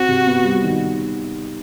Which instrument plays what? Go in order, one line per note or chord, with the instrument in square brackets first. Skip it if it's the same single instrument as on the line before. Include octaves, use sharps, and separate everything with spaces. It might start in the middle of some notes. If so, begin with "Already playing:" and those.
Already playing: [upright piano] C4 [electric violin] F#4
[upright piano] C3
B3
G3
D#3